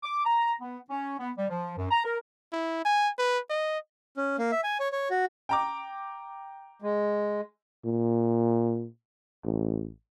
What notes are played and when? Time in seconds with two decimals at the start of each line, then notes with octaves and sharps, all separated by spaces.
0.03 D6
0.25 A#5
0.61 B3
0.89 C#4
1.19 B3
1.37 G3
1.48 F3
1.78 F#2
1.91 A#5
2.04 A#4
2.52 E4
2.85 G#5
3.18 B4
3.50 D#5
4.17 C#4
4.39 A#3
4.52 E5
4.64 G#5
4.80 C#5
4.93 C#5
5.10 F#4
5.49 G5 A#5 D6
6.82 G#3
7.85 A#2
9.45 A1